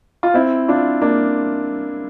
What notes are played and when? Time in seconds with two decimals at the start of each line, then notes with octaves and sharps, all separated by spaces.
0.23 F4
0.34 C4 E4
0.68 D4 F4
1.02 A#3 D4